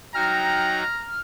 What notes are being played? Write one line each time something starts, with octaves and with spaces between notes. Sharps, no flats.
F#3 D#4 F#4 G5 A#5 F6